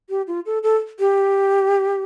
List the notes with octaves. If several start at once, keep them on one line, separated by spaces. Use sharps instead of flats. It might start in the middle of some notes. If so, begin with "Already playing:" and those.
G4
F4
A4
A4
G4